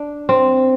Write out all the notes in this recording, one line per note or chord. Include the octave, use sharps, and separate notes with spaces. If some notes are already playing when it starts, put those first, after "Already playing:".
Already playing: D4
C4